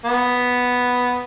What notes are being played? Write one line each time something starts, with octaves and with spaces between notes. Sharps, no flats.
B3